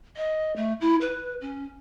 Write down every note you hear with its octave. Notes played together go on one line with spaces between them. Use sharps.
D#5
A3
E4
B4
C#4